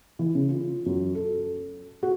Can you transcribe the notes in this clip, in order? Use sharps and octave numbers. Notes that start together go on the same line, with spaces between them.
E3
C#3
F4
F#2
A4
F#4